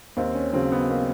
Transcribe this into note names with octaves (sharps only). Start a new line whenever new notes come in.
D#2 C4
C#4
C#3 F#3 C4
B3
A#3